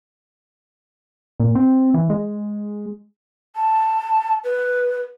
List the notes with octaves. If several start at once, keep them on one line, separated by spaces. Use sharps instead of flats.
A#2
C4
E3
G#3
A5
B4